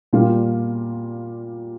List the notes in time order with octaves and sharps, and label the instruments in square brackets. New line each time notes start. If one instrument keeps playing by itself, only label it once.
[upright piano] A#2 G3 A#3 F4